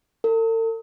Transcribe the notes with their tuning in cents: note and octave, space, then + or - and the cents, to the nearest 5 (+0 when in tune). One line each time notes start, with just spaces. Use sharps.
A4 +45